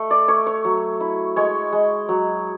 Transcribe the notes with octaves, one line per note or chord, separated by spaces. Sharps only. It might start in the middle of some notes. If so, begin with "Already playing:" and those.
Already playing: A3
D5
A3 C#5
C#5
F#3
E4
G#3 C#5
G#3
F#3